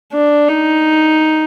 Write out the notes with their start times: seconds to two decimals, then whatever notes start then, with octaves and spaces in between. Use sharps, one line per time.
0.13 D4
0.49 D#4